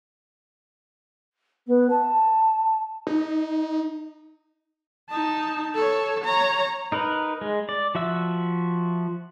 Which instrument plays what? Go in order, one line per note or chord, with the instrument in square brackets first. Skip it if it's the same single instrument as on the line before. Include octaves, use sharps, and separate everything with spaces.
[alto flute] B3
A5
[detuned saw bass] D#4
[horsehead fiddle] D#4 A5
A4 C#5
C#5 A#5
[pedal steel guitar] D#4 A#4 B4
G#3
D5
F3 F#4 E5 E6